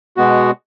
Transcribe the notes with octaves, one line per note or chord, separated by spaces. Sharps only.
B2 G#3 B3 F#4